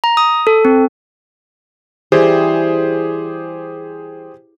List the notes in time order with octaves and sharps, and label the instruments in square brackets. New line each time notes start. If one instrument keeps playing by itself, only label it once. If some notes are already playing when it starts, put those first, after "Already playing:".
[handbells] A#5
D#6
A4
C4
[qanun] E3 G3 [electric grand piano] G4 G#4 C5